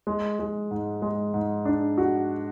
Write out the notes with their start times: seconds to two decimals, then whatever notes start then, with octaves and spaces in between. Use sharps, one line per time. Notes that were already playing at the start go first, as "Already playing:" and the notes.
0.07 G#3
0.39 G#3
0.71 G#2
1.02 G#3
1.34 G#2
1.65 D4
1.98 F#4